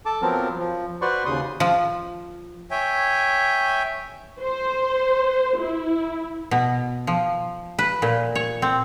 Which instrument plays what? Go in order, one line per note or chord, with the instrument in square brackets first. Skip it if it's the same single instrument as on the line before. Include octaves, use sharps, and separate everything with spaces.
[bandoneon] A4 A5 D6
F3 F#3 B3 C4 A#4
F3
F#4 B4 C5 D5 C6 C#6
D#2 C#3 C6 D#6
[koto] F3
[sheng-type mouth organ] C#5 E5 G5 G#5
[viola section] C5
E4
[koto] B2
F3
B4
A#2
C#5
C4